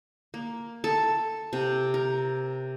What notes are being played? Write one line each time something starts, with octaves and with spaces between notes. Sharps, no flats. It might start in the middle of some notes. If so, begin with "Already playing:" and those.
A#3
A4
C3
A#4